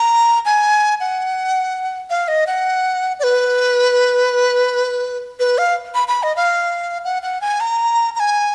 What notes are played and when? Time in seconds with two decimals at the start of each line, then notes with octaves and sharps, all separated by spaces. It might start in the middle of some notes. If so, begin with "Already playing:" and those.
Already playing: A#5
0.45 G#5
1.00 F#5
2.10 F5
2.28 D#5
2.47 F#5
3.20 D5
3.23 B4
5.40 B4
5.58 F5
5.95 B5
6.08 B5
6.23 D#5
6.36 F5
7.05 F#5
7.23 F#5
7.41 G#5
7.60 A#5
8.15 A#5
8.20 G#5